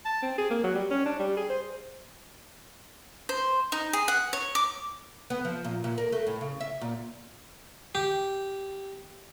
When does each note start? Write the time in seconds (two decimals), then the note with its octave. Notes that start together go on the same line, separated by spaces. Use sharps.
0.06 A5
0.23 C4
0.38 G#4
0.50 A#3
0.64 F#3
0.75 G3
0.91 C#4
1.06 D4
1.19 G3
1.37 G#4
1.50 C5
3.29 C5
3.72 D#4
3.93 G#4
4.08 F#5
4.33 C#5
4.55 D6
5.30 B3
5.45 F3
5.64 A#2
5.84 A#2
5.98 A#4
6.12 A3
6.27 A2
6.41 C#3
6.60 E5
6.81 A#2
7.95 G4